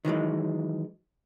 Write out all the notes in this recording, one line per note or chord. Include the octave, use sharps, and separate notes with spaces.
D#3 E3 F#3 G#3